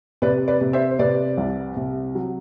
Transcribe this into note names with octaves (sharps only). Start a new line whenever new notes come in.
C3 B4 D5
B4 D5
C3
C5 E5
C5
C3 B4 D5
C2
C3
F#3